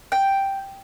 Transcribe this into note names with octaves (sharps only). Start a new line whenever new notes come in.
G5